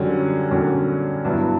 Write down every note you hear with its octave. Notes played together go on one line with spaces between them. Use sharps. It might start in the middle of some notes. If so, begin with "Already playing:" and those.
Already playing: F#2 D3 G3 C#4 F#4
F#2 D3 G3 C#4 F#4
G2 F#3 B3 E4